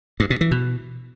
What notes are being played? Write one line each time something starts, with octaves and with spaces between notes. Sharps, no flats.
G2
B2
E3
B2